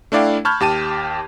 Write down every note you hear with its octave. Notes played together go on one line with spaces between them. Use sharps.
A3 D4 E4 D5 F5 G5
A5 B5 C#6 F6 G6 G#6
D#2 G4 A5 D#7